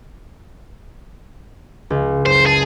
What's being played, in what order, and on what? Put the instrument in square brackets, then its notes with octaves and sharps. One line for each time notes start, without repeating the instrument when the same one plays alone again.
[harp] C#2
[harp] F#1 [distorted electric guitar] C5
[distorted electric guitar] G#4 [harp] A5